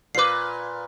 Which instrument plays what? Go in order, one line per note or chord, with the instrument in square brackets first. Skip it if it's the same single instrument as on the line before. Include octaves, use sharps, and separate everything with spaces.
[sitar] A#2 B4 [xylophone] D6 C7